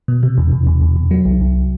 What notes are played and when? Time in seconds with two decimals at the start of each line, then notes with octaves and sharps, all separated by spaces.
0.08 B2
0.23 C3
0.38 E2
0.52 E2
0.67 E2
0.81 E2
0.96 E2
1.11 F#3
1.25 C2
1.41 C2